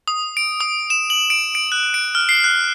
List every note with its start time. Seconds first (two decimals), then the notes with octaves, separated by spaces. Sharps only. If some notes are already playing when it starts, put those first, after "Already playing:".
0.08 D#6
0.37 D7
0.61 D#6
0.90 E7
1.10 F#7
1.30 D7
1.55 D7
1.72 F#6
1.94 D7
2.15 F6
2.29 C7
2.44 F#6